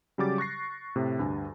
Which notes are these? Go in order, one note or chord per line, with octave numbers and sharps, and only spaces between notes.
C#3 F#3 G3 G4 D6 A6
C#6 F#6 A#6 C7
A2 C3
D2 G2 G#5